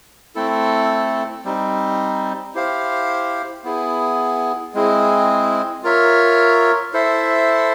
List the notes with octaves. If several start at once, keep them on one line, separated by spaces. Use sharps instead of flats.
A3 C4 E4 A4
G3 C4 D#4
E4 G4 C5 F5
B3 E4 G#4
G#3 C4 E4 G#4
F4 A#4 C#5 E5
E4 A4 C5 E5